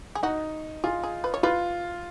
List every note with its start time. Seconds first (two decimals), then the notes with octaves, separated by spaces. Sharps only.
0.15 G#4
0.23 D#4 F#4
0.84 F4 G#4
1.03 G#4
1.24 B4
1.34 C#5
1.43 F4 B4